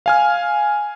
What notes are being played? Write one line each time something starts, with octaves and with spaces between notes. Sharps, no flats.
F5 G#5 F6